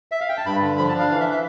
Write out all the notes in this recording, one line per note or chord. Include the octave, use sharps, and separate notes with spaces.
E5
F5
G5
A5
G2 B5
D3
F3 B5
A5
D4
F5
E3 F5
E5
E5